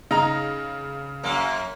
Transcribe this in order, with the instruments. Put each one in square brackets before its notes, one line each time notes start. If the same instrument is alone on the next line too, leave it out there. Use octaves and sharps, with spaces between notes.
[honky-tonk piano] C#3 [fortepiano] D#4 A#5
[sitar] F#2 A#3